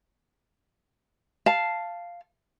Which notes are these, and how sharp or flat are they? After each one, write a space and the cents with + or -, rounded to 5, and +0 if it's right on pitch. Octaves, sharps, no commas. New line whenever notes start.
F5 -5 A5 +0